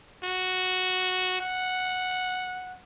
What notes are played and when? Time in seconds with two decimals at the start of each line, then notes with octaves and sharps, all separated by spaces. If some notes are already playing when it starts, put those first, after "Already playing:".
0.24 F#4
1.40 F#5